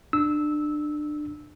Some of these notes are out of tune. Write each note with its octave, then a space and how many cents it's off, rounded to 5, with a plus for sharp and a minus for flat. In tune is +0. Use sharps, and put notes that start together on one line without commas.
D4 +25 E6 -15